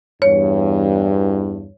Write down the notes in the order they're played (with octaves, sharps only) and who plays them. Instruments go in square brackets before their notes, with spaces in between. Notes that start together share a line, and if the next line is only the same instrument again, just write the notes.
[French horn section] E2 G2 [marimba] C#5